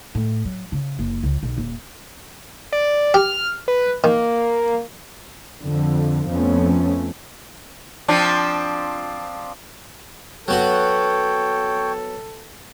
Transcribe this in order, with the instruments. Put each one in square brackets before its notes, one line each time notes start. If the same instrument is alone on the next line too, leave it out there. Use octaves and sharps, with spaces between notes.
[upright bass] A2
F#3
C#3
F#1
C#2
B1
D#1
[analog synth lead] D5
[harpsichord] G4 [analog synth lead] F6
[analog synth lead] B4
[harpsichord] D#3 [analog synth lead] A#3
[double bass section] F2 D3
F2 F3 A3 B3 C#4
[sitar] F3 C4 D4
[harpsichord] F#3 B3 F#4 [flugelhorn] A4 [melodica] C#5 G5